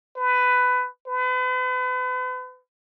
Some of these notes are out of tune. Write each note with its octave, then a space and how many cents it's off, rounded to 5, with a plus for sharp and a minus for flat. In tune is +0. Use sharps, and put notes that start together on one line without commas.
B4 +15
B4 +40